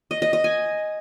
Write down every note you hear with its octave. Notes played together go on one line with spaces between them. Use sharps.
D#5
D#5
D#5
G#5